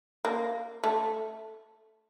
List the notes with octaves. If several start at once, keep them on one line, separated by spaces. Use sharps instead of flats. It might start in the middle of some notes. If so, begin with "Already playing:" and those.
A#3
A3